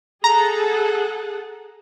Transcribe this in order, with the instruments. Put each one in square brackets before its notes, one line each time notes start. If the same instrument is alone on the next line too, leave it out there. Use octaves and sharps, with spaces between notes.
[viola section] G#4 A4 F#5 [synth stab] A#5